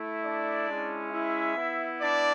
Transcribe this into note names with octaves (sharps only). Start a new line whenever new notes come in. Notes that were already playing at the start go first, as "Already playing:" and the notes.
Already playing: A3 E4
D4 D5
G#3 C#4 E4
E4 E5
B3 E4
D4 D5